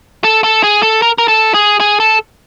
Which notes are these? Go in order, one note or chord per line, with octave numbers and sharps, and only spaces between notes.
A4
A4
G#4
A4
A#4
A#4
A4
G#4
G#4
A4